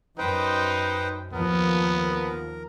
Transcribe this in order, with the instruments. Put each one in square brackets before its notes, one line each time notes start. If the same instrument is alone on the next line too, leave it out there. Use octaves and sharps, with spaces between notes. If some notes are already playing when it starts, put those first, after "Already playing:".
[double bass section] F#2 [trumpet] D#4 [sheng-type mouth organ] B4 C5 G5
[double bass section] D#2 F3 [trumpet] B3 [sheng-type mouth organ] A#4